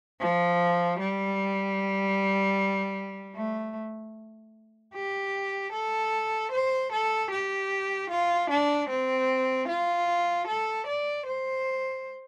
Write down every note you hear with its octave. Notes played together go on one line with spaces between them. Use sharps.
F3
G3
A3
G4
A4
C5
A4
G4
F4
D4
C4
F4
A4
D5
C5